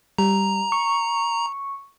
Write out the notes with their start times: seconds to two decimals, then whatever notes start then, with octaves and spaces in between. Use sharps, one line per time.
0.18 G3 A#5
0.72 C#6